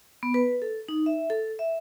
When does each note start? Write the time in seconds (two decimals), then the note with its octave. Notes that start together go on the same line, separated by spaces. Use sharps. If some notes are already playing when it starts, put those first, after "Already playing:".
0.23 B3
0.34 B4
0.62 A4
0.88 D#4
1.06 E5
1.30 A4
1.59 E5